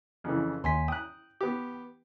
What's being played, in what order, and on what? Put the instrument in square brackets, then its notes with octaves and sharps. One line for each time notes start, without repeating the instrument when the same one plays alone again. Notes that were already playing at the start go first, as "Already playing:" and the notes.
[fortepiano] F2 C#3 E3
[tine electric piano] D#2 G#5 B6 [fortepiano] C6
[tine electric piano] G5 [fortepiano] D#6 F#6
[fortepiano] B3 G4